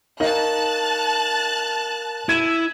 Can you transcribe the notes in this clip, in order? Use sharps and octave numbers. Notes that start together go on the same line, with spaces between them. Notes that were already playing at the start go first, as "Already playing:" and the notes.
D#4 A#4 C#5 F5 A5 F#6
E4 G#6 D#7